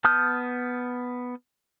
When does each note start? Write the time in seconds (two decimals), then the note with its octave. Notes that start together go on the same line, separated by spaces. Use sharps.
0.04 B3 A5 D#6 F6 G6